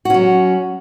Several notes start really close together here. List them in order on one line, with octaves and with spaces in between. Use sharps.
F#4 C#4 F#3